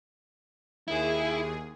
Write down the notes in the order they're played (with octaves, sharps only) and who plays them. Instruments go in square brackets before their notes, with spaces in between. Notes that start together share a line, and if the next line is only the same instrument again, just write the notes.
[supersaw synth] D#2 G#4 [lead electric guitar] E4